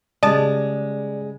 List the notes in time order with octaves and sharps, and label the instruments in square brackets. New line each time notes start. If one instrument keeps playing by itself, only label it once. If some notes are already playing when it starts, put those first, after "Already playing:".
[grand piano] C#3 G3 [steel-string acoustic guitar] G#3 [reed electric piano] D5 [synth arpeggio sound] D#5 A5